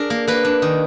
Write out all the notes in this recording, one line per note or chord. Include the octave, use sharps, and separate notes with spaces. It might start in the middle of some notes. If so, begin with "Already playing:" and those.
Already playing: D4 G#4 A#4
A#3
A#3 B4
D4
D#3